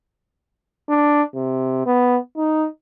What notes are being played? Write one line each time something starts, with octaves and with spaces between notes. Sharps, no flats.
D4
C3
B3
D#4